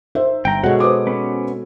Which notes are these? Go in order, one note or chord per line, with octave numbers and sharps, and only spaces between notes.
D#4 C5 E5
G1 G5 A#5
B2 G#3 F#4 A4 C#5 F#5
B4 C5 D6 D#6
B3 C#4